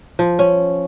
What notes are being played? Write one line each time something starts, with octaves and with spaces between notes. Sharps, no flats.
F3
C#4